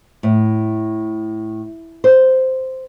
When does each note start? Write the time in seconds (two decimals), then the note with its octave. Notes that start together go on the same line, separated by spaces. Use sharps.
0.23 A2
2.04 C5